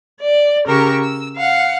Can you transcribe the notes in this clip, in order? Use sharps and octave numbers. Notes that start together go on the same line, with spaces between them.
D5
C#3 G4 A#4 C#6 E6
E6
F5 F#5